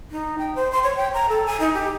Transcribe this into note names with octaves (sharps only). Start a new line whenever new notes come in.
D#4
G5
C5
C6
C#5
G5
A#5
A4
G#5
D#4
G4